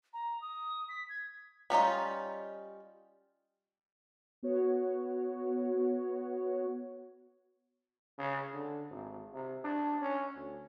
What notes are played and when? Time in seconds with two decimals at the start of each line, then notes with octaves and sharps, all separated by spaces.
0.13 A#5
0.42 D#6
0.89 B6
1.09 G#6
1.70 G3 C#4 D#4 F4
4.43 B3 F#4 C#5
8.18 C#3
8.54 D3
8.90 G#1
9.34 C3
9.64 D4
10.01 C#4
10.36 D2